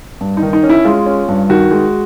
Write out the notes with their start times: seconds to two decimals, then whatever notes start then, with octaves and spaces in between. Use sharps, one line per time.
0.21 G2
0.37 D#4
0.42 D#3
0.53 D#4
0.63 C#4
0.70 E4
0.85 G#3 F4
1.06 C#4
1.28 G2
1.49 D#3 F#4
1.71 G#3